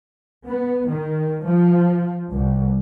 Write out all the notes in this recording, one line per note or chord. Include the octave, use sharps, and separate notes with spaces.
B3
D#3
F3
C2